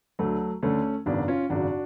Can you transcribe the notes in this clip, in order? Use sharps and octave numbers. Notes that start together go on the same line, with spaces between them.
D2 D3 F#3 A3
D2 D3 A3 C#4
G#1 F#2 C#3 B3 D4
C#4 F4
G#1 F#2 C#3 D4 F#4